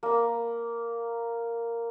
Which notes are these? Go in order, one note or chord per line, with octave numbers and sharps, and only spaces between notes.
A#3 B5